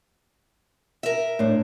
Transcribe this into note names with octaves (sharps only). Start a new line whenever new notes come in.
A#4 E5
A2 D4 C5